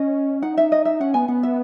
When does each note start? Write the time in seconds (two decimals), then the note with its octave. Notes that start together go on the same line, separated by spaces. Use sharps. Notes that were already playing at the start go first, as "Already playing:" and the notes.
Already playing: C#4 D#5
0.42 D#4 F#5
0.57 E5
0.72 D#5
0.85 E5
1.00 C#4 F#5
1.14 B3 G#5
1.28 B3 F#5
1.43 E5